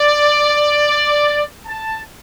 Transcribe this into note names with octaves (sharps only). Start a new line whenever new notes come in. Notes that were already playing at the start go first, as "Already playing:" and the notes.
Already playing: D5
A5